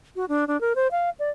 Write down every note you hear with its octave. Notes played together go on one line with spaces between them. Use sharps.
F#4
D4
D4
A#4
C5
F5
D5